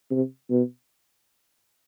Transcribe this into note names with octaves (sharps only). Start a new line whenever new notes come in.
C3
B2